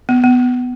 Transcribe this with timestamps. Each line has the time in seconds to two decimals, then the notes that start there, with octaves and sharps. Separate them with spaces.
0.09 B3
0.24 B3